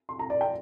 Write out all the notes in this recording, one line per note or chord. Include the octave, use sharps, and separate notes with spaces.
C6
A#5
D5
G5